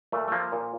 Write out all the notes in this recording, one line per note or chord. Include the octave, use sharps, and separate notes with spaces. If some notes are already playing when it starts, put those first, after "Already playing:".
A#2 A3
A3
F3 A#3
A#2